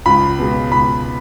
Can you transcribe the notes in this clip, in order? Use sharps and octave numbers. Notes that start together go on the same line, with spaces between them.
C#2 B5
B2 G#3
C#2 B5